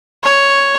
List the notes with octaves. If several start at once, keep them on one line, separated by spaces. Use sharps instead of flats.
C#5